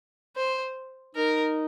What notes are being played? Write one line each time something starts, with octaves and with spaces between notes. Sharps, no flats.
C5
D#4 A#4